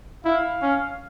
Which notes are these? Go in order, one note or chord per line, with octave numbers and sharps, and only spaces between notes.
E4 F5
C#4